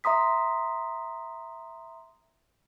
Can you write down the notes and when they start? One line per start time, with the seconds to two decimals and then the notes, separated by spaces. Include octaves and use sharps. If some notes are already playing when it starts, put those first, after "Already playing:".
0.04 E5 A#5 C6 D#6 B6